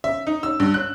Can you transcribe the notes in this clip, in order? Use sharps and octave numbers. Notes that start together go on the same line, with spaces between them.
E5
D#4
E6
G2
F#6